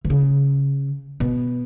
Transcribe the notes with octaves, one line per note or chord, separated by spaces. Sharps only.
E3
C#3
B2